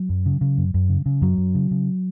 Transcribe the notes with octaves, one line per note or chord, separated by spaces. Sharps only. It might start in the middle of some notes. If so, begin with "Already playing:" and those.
Already playing: F#3
F#2
C#3
C#3
F#2
F#2
C#3
C#3
F#2 F#3
F#2
C#3
C#3